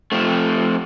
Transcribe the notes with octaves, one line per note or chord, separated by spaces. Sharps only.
F3 A3 C4